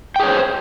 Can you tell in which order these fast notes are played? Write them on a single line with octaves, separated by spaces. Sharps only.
G5 G#4 C#5 C5